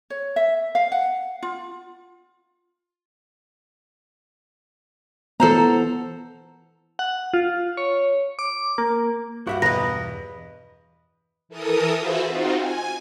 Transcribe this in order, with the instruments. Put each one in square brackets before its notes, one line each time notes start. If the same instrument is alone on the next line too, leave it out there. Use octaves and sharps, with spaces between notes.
[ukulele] C#5
E5
F5
F#5
F4
[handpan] E3 B3 [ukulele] A4 C5 A#5
[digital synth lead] F#5
F4
C#5
D6
A#3
[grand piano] G2 [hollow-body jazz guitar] F#4 E5 F#5
[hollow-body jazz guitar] E2 B2 A#5 [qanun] B4 D#5 [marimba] A#6
[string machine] E3 A4 A#4 D#6
F4 F#4 G#4 B4 C5 E5
C4 D#4 F4 F#4
G#5